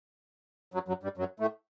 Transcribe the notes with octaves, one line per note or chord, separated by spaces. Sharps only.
F#2 F#3
F#2 F#3
G2 G3
F#2 F#3
A2 A3